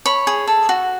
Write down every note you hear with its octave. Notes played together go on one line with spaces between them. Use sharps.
C#5 B5
G#4
A4
F#4